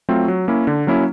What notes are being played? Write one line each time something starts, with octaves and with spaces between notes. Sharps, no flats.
F#3 A3 C4 F4
F#3
A#3 C#4 E4
D3
F#3 A#3 C#4 E4